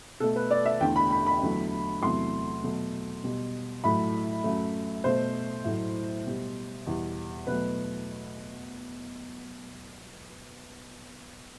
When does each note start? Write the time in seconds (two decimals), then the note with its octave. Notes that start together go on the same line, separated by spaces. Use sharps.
0.20 B2 A3 A4
0.36 B4
0.51 D5
0.65 E5
0.80 E2 D3 A3 G5
0.96 B5
1.11 B5
1.26 B5
1.42 E2 D3 F#3 A3
2.02 E2 C3 F#3 A3 C6
2.63 B2 F#3 A3
3.23 B2 G3
3.84 A2 F#3 A3 B5
4.44 F#2 F#3 A3
5.04 B2 A3 C5
5.65 A2 F#3 A3
6.26 B2 G3
6.86 E2 B2 G3
7.47 B2 F#3 A3 B4